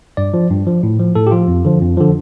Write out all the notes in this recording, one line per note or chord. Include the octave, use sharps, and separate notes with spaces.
G2 D5
F3
G2
F3
A2
F3
A2 A4
G4
F3 F4
F2
D3 F3
F2
D3 F3